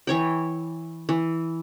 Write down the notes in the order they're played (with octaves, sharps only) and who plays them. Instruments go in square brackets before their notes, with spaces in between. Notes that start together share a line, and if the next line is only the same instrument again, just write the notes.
[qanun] E3 C#5 G5
E3